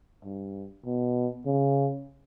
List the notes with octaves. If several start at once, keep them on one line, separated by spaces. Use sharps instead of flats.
G2
B2
C#3